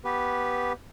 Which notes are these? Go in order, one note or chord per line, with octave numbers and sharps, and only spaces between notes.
B3 G4 B4